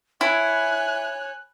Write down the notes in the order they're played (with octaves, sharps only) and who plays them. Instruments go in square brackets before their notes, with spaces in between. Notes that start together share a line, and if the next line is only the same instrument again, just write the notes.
[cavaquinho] E4 [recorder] C#5 [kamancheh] G#5 F#6